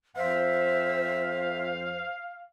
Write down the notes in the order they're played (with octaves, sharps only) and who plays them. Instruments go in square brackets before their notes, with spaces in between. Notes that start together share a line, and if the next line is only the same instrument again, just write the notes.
[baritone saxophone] F2 [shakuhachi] C5 [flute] E5 [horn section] F5